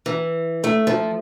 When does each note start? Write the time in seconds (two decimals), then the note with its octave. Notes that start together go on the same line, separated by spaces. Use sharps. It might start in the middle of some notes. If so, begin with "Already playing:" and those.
0.06 E3
0.64 A3
0.87 F3